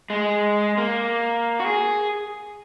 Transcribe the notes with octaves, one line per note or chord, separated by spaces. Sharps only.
G#3
A#3
F#4
G#4